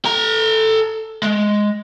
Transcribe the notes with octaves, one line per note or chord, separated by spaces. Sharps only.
A4 A#5
G#3